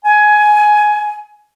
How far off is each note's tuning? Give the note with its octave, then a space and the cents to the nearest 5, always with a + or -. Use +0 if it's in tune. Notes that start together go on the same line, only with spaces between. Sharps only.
G#5 +15